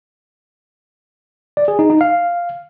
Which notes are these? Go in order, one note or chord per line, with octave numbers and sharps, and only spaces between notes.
D5
G#4
D#4
D#4
F5